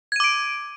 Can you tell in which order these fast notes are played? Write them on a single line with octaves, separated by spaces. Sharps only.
G#6 D#7 D6 D7